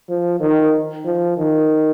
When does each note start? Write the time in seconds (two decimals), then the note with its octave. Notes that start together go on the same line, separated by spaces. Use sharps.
0.09 F3
0.40 D#3
1.05 F3
1.37 D#3